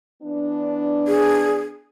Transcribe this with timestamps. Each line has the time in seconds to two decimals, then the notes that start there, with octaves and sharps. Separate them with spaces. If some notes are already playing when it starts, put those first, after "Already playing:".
0.22 E3 B3 D4
1.08 G#4